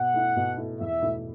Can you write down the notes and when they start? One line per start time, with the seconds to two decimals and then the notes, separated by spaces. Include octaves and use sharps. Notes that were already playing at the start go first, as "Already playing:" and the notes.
Already playing: B2 F#5
0.14 A3 E4
0.36 B2
0.57 A3 E4
0.80 E2 E5
1.02 B2 A3 E4